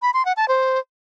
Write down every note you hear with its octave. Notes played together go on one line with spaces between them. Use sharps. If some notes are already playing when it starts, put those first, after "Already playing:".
B5
C6
F#5
A5
C5